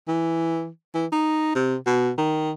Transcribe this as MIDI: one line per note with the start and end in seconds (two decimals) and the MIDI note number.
0.08 0.68 52
0.94 1.06 52
1.12 1.52 63
1.55 1.75 48
1.86 2.11 47
2.18 2.51 51